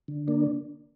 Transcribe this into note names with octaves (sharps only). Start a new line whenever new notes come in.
D3
A#3 D4